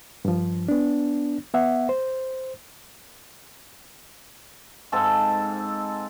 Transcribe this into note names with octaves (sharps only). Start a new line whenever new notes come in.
G2 F3
B3 D4
B3 E5 F#5
C5
G#2 C4 A4 F5